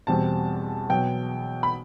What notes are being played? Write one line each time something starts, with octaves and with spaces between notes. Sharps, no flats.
E2 B2 G3 C4 A5
B2 F#3 B3 G5
B5